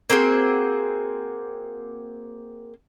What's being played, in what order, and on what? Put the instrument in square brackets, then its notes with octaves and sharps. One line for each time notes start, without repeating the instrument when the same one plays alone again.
[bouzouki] A#3 C4 F#4 G#4